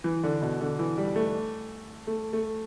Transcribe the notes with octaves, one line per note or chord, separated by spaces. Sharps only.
E3
D3
B2
D3
E3
G3
A3
A3
A3